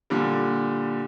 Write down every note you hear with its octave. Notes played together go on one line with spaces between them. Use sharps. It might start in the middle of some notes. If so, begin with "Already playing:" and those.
A#2 D3 G3